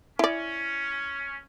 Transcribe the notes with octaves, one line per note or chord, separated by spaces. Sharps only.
C#4 E4 D5